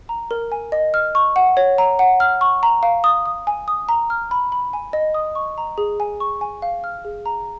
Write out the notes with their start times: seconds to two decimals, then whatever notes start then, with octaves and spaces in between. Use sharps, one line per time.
0.09 A#5
0.31 A#4
0.52 G#5
0.72 D#5
0.94 F6
1.15 C#6
1.36 F#5
1.57 C#5
1.78 A#5
1.99 F#5
2.20 F6
2.41 C#6
2.63 A#5
2.83 F5
3.04 D#6
3.26 D#6
3.47 G#5
3.68 D#6
3.89 A#5
4.10 F6
4.31 B5
4.52 B5
4.73 G#5
4.93 D#5
5.14 D#6
5.35 C#6
5.58 A#5
5.78 G#4
6.00 G#5
6.20 C#6
6.41 G#5
6.62 F5
6.84 F6
7.05 G#4
7.26 A#5